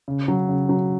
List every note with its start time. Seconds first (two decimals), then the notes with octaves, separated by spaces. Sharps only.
0.08 C#3
0.28 F#3
0.49 C#3
0.69 F#3